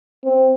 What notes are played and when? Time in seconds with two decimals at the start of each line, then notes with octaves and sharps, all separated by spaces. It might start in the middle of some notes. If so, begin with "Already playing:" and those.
0.25 C4